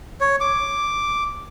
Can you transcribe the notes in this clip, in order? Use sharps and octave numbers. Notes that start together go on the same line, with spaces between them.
C#5
D6